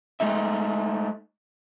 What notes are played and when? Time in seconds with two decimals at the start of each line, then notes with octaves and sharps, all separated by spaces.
0.20 G#3 A3 D#4 E5